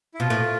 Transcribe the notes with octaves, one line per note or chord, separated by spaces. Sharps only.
E4
B2 F4
A2